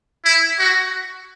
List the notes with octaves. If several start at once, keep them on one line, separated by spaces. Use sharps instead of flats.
E4
F#4